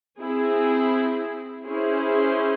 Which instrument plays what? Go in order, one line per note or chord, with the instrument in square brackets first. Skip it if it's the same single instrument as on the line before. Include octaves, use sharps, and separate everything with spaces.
[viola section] C4 E4 G#4
C#4 E4 G#4 C5